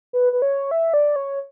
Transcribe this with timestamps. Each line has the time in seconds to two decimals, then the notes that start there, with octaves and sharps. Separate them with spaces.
0.13 B4
0.33 B4
0.42 C#5
0.71 E5
0.94 D5
1.16 C#5